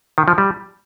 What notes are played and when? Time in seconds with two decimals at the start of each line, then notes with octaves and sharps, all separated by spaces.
0.18 D#3
0.28 F3
0.38 G3